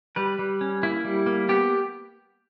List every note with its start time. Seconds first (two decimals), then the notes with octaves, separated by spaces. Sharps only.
0.16 G3 B4
0.39 G3
0.61 C#4
0.83 A#3 E4
1.05 G3
1.26 A#3
1.49 B3 G4